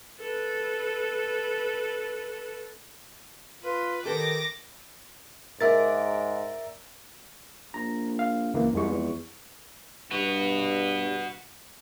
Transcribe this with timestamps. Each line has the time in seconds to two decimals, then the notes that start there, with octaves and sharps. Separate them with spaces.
0.20 A4 B4
3.63 F4 B4
4.05 D#3 G4 A4 B4 D6 A#6
5.61 G#2 A#4 D5 E5 A6
7.74 A#1 A#5
8.19 F5
8.54 C#2 E3 A#3
8.73 C2 F2 G#3 C#6
8.89 E2
10.11 G2 F#4 B4